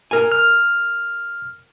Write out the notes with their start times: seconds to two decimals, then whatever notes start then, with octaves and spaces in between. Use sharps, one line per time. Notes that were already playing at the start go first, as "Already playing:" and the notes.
0.11 A#4 G#5
0.32 F6